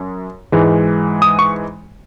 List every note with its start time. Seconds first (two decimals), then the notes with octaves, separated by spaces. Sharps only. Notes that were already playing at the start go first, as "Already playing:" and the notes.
Already playing: F#2
0.52 G#2 E3 G#3
1.22 D#6
1.39 C#6